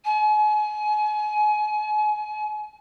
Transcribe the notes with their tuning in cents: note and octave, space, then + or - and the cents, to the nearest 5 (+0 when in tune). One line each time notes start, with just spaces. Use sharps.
G#5 +35